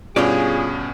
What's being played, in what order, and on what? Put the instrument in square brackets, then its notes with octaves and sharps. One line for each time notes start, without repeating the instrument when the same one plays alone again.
[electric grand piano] G2 B2 C#4 [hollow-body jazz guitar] F4 G4 D5 [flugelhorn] G#4